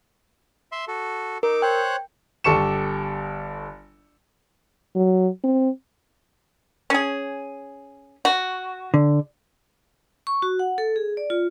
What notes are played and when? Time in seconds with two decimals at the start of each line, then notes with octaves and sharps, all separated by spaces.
0.72 E5 C6
0.88 F#4 A4
1.43 D#4 A#4 D6
1.62 C5 C#5 G5 F#6
2.44 G1 G4 A4 C#6 C#7 E7
4.95 F#3
5.44 C4
6.90 C#4 G#4
8.25 F#4
8.94 D3
10.27 C#6
10.42 F#4
10.59 F#5
10.78 A4
10.96 G#4
11.17 D5
11.30 F4